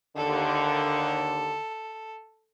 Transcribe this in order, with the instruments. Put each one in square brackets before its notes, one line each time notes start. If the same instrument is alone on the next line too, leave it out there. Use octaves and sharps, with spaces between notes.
[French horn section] D#2 D3 [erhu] A4